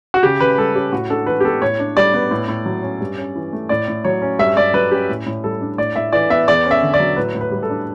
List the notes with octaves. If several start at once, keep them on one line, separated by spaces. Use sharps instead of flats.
F#4
C#3 G4
C#3 B4
G3 A4
C#4 G4
A2 F#4
D4 A4
E3 B4
G4
B3 A4
A2 C#5
D4
G3 D5
B3
A2
A2
F#3
C#4
G2
C#4
E3
A3
A2 D5
A2
F#3 C#5
C#4
G2 E5
G2 D5
F#3 B4
C#4 G4
A2
A2
G3 A4
D4
A2 D5
A2 E5
E3 D5
B3 E5
E2 D5
C#4
E5
D3
D5
F#3
A2 B4
A2
B4
G3
A4
D4